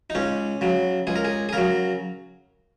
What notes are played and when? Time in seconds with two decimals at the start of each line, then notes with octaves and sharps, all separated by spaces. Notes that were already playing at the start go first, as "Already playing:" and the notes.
0.10 D#4
0.15 C#2 C#4
0.61 C#3 F#3
1.07 C#2 G#4
1.16 A#4
1.25 G#4
1.49 G#4
1.53 C#3 F#3 A#4